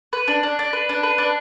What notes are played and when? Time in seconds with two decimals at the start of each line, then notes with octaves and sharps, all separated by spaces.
0.13 B4
0.28 D4
0.43 D4
0.59 D4
0.73 B4
0.89 D4
1.03 B4
1.18 D4